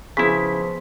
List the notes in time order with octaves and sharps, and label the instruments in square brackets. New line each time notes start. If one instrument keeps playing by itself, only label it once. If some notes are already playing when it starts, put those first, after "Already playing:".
[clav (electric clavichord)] C#3 E4 [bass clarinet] F3 [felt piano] B3 G#4 [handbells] C6 B6